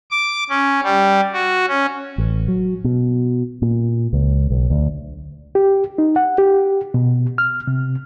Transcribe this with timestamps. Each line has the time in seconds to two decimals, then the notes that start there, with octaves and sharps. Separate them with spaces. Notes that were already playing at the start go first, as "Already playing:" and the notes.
0.11 D6
0.50 C#4
0.83 G3
1.33 F#4
1.68 C#4
2.18 A1
2.48 F#3
2.84 B2
3.62 A#2
4.13 C#2
4.50 B1
4.70 D2
5.55 G4
5.98 D#4
6.16 F#5
6.38 G4
6.94 B2
7.38 F6
7.67 C3